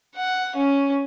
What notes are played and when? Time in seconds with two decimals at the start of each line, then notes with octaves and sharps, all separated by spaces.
0.16 F#5
0.57 C#4